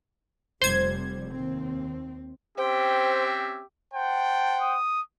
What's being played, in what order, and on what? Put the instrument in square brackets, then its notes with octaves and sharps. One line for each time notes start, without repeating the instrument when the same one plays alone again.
[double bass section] F1 C3 G3 [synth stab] C5 G#6
[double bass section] D#2 C4
[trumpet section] C4 C#4 E5 [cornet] G4 [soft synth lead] C5 [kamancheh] G5
[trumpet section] C5 F#5 G5 [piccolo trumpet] A5
[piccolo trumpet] D#6